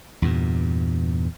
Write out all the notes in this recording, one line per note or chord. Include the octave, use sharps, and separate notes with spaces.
E2 G2 A#2